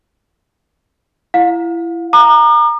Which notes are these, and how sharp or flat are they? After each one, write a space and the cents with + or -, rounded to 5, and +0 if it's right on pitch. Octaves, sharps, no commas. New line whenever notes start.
E4 +30 F5 +40
A#5 +0 D6 +45